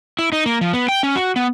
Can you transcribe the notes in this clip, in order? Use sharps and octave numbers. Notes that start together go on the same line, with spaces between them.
E4
D#4
A#3
F3
B3
G5
C#4
F#4
B3